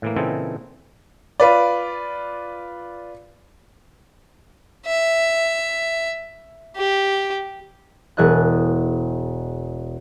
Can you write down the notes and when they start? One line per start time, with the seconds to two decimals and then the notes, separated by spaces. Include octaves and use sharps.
0.02 A2 E3 A#3
0.16 A#2 C#3 E3 C4 D#4 A4
1.40 F4 B4 D5
4.86 E5
6.77 G4
8.17 E1 G#4 D#5 F#6